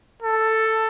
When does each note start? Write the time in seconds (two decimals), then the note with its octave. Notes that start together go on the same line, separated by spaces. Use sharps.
0.22 A4